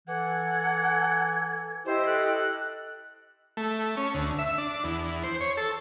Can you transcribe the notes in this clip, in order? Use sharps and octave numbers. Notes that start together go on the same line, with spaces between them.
E3 A4 F#5 G#6
E4 G4 C5 D#5
A4 F#6
A3
C#4
D2
E5
D4
E2
C5
C#5
A4